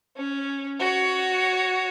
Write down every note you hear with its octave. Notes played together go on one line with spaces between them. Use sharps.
C#4
F#4 C#5